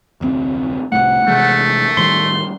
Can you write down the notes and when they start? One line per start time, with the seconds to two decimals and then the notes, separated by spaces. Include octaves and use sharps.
0.21 F1 D2 C4
0.92 C2 A2 A3 F#5
1.28 C3 E3 G#3 A3
1.97 A2 D#3 G3 C6